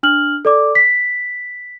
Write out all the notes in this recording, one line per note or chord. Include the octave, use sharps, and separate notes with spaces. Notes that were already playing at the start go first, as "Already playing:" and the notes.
D4 F6 F#7
A4 D5 D6
B6